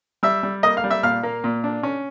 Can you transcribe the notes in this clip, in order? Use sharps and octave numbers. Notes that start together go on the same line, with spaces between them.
G3 E5 E6
G3
A#3 D#5 D#6
F5 F6
G3
E5 E6
A#2 F5 F6
A#3
A#2
D4
C#4